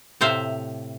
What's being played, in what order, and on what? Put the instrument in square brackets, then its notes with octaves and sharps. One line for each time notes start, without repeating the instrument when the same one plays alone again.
[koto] A2 C3 C5 E5 F5